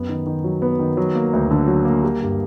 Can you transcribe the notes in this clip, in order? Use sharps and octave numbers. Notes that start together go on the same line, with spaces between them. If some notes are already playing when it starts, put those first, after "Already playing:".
Already playing: F#2 B3
D#3
D#3
F#3
B3
D#3
F#3
A#3
D2
D3
F#3
A#3
G3
G2